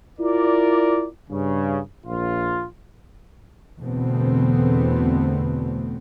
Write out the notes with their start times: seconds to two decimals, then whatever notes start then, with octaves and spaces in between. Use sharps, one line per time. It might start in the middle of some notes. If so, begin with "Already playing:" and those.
0.19 E4 F4 A#4 D5
1.30 G2 C#3
2.07 A#1 F4
3.80 E2 B2 D3 A3 B3 C4